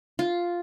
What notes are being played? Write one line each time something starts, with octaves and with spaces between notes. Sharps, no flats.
F4